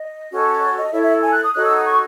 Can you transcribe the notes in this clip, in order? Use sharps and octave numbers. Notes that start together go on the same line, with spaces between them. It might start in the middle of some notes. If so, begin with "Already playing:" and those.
Already playing: D#5
C#4 F#4 A4 C#5
C#5
D#5
E4 A4 C#5 E5
E5
G#5
F#6
D#6
D#4 F#4 A4 C#5 F#6
E6
D#6
C#6